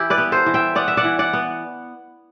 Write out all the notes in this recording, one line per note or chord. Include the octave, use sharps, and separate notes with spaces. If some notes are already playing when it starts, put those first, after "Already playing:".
Already playing: E3 E4 G4
B4 D5
B3
A4 C5
E3
E5 G5
B3 D5 F#5
E5
D5 F#5
E3
D5 F#5
B3